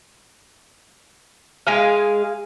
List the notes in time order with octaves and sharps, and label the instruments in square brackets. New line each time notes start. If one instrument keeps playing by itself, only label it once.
[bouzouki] G#3 G#4 F5